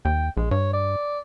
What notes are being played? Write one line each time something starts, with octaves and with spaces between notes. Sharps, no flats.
D#2 G5
A#1 G#3
G2 C#5
D5